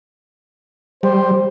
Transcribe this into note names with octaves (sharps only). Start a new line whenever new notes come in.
G3 C5